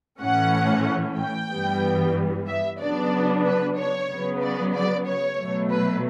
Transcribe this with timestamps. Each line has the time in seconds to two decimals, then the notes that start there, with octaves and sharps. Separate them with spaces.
0.20 A2 E3 A3 C#4 F#5
1.17 G5
1.51 G2 E3 G3 B3
2.47 E5
2.79 C#3 F#3 B3 D4 D5
3.44 B4
3.77 C#5
4.09 C#3 F#3 B3
4.41 D5
4.73 D5
5.05 C#5
5.38 B2 F#3 A3
5.70 B4